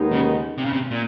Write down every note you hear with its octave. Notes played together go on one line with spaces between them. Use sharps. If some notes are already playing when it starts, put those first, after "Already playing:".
Already playing: D#2 D#3 G#3 B3 D#4
C#3
C3
C#3
C3
A#2